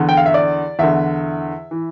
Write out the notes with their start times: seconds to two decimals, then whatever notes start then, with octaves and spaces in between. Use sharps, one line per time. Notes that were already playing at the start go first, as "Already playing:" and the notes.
Already playing: E2 D3
0.09 G5
0.17 F5
0.26 E5
0.34 D5
0.79 E2 D3 E5
1.71 E3